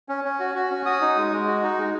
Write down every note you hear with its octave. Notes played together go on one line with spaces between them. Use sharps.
C#4
C#4
F#4
F#4
C#4
F#4 D#6
D#4
G#3
G#3
F#4
D#4
G#3